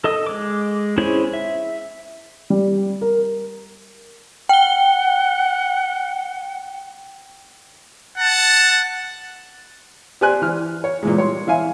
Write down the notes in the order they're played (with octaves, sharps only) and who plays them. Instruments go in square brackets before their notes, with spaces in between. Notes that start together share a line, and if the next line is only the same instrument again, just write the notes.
[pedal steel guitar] A4 D#5 D#6
G#3 D6
C#4 E4 G#4 C5 C#5
E5
[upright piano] G3
A#4
[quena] F#5 [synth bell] G5 G7
[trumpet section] F#5 A5
[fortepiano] G4 C5 D5 G#5 C6 F#6
E3 F6
C#5
A#2 E3 G#3
G3 C#5 C6
E3 E5 F5 G#5